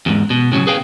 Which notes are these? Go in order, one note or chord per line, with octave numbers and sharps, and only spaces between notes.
E2 G#2
B2
A2 C#3 F3 F#3
G#4 B4 F5 G5